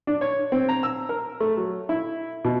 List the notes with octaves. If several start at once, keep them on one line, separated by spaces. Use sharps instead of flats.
D4
C#5
C4
A#5
E6
A#4
A3
F#3
E4
B2